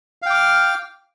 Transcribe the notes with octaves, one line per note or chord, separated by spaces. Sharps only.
F5 G5 D6 F6